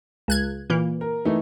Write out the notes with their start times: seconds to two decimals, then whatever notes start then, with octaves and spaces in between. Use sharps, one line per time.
0.28 C#2 F#6 G#6
0.70 A#2 E3 A#3
1.01 A#4
1.25 E3 A3 D#4